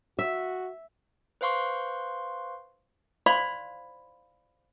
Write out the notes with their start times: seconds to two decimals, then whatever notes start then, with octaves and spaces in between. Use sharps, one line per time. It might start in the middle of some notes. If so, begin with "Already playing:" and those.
0.19 F#4 E5
1.41 B4 C5 F5 C6 C#6
3.26 C5 D5 F5 B5 C6